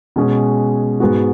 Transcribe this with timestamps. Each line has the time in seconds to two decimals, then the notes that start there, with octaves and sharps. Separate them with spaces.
0.16 B2 G#3 C#4 G#4
1.00 G#2 G#3 B3 F#4